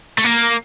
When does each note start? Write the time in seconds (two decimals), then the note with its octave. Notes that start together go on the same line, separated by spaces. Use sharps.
0.18 A3
0.24 A#3